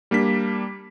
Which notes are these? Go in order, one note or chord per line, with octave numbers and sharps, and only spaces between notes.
G3 A#3 D4 B6